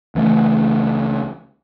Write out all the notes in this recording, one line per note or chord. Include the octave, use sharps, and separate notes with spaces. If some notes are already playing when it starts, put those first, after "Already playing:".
C#2 E3 A3